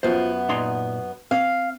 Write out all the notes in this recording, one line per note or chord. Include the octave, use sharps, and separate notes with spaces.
F#2 B3 F4 C5
A#2 D#4 C6
C4 F5